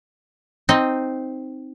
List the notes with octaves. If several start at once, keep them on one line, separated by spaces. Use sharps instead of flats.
C4 D#4 D#5